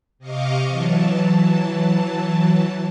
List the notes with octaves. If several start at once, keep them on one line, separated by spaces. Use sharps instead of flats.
C3 D#5 F5 C#6 D6
E3 F#3 A5